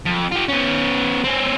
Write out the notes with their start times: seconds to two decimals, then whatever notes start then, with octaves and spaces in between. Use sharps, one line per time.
0.05 F2
0.31 F4 G4
0.48 B3 C#4
1.24 C4 C#4